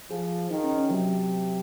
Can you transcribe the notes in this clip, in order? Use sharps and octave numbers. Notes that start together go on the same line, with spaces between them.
F3 G#4
D#3 D#4
C#4
C#4
C3 F#3